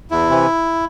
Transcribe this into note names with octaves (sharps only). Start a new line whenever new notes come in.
E2 E4
C3 E3